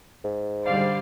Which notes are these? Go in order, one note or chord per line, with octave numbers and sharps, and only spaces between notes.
G#2
D3 G3 C5 D5 F5